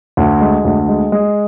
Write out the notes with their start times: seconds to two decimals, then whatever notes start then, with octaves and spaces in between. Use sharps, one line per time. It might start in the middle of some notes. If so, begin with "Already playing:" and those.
0.17 D2
0.41 G#3
0.65 D2
0.88 G#3
1.12 G#3